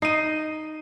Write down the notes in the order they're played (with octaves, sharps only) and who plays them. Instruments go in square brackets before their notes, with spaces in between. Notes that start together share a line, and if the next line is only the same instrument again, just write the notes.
[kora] D#4 [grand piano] C7 D#7